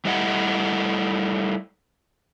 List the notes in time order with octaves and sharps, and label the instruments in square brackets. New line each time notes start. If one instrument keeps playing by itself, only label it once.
[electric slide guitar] G3 A3 E4 D#5 F#5